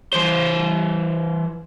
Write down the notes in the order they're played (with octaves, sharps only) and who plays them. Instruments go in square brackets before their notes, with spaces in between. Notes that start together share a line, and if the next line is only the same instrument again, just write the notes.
[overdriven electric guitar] E3 C5